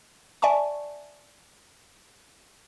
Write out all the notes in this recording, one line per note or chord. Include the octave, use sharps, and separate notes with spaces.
D5 E5 G#5 A5 C#6